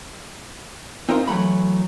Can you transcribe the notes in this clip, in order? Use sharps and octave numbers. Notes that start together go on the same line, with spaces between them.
C4 D#4 F4 A#4 C5
E3 F#3 A3 B5